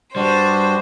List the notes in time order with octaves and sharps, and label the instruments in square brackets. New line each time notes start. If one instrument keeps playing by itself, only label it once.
[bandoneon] G2 D4 F#4 [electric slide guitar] G3 [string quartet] C5